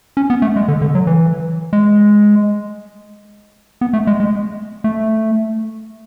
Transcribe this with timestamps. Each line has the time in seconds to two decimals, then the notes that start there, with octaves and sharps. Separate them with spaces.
0.17 C#4
0.30 B3
0.42 A3
0.56 G#3
0.68 D3
0.82 D3
0.95 F#3
1.07 E3
1.73 G#3
3.81 B3
3.93 A3
4.07 G#3
4.20 G#3
4.84 A3